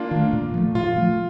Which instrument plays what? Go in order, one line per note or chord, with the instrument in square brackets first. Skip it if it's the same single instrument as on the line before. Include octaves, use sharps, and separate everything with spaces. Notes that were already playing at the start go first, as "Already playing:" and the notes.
Already playing: [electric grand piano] A#3 D4 F4
[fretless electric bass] D#3 A3
A#2
F3 A3
[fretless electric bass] A#2 [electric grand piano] F4
[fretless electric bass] F3 A3